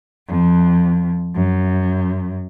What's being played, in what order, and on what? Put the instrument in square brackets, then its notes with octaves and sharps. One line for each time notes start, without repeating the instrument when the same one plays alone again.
[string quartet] F2
F#2